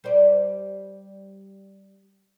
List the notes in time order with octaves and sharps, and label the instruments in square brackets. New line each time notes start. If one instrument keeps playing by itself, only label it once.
[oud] G3 C5 D5